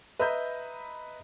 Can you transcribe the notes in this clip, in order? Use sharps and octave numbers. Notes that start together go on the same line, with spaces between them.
B4 D#5 E5 A#5 B5 G6